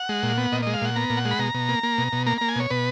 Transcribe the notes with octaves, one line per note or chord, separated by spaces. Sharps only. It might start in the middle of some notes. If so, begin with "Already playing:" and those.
Already playing: F#5
G#3
A#2
B3
A#2 D#5
G#3 D#5
F5
A#2 F#5
B3 A#5
A#2
F#5
G#3
B5
B2 A#5
B2
A#3
A#3
B2
B2
A#3 A#5
A#3 A#5
G#5
B2 C#5
B2 B4